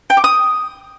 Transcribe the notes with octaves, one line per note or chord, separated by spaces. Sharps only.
G5
D6
D#6